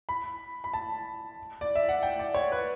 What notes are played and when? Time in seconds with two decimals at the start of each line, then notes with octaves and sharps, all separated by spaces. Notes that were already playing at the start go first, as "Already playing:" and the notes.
0.09 B5
0.64 B5
0.73 A5
1.61 D5
1.76 E5
1.89 F#5
2.03 G5
2.19 D5
2.35 C#5
2.52 B4